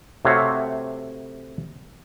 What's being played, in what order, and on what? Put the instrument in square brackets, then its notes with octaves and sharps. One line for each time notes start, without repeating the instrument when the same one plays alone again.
[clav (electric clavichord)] C3 A3 F#4 C#5 F5